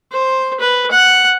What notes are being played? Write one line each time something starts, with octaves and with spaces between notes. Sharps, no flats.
C5
B4
F#5